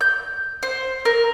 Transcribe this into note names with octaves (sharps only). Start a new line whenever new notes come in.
G6
C5
A#4